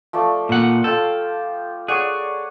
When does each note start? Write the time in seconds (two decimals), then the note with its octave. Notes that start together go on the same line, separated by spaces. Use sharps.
0.13 F3 A3 D5
0.49 A#2 F#5
0.84 F4 A4 G5
1.88 G#4 C#5 D5 F#5